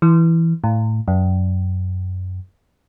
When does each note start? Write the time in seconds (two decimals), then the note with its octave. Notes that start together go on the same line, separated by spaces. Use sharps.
0.02 E3
0.64 A2
1.08 F#2